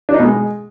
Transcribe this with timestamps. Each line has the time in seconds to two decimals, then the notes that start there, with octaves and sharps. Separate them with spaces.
0.09 D4
0.14 D#4
0.19 B2
0.25 G#3